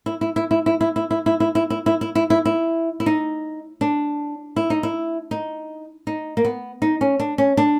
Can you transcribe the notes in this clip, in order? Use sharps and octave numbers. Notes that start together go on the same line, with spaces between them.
E4
E4
E4
E4
E4
E4
E4
E4
E4
E4
E4
E4
E4
E4
E4
E4
E4
E4
D#4
D4
E4
D#4
E4
D#4
D#4
A#3
B3
D#4
C#4
D4
C#4
D4